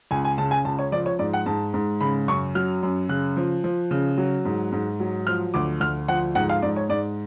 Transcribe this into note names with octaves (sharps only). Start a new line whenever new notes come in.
C#2 G#5
G#5
C#3 A5
G#5
C#2 A5
C#5
F3 D5
C#5
G#2 D5
F#5
G#2 A5
G#2
C#3 B5
F#2 C#6
F#3 F6
F#2
C#3 F#6
F3
F3
C#3
F#3
G#2
G#2
F#3
F3 F6
D2 D6
D2 F6
F3 F#5
G#2 F#5
F5
G#2 D5
C#5
G#2 D5